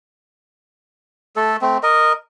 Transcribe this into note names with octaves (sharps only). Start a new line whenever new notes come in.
A3 A4
A3 C4
A#4 D#5